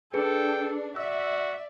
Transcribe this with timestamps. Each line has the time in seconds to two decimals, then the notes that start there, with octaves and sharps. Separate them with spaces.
0.14 D4 G#4 A4 B4 G5 C#7
0.96 F#4 D5 E5 E6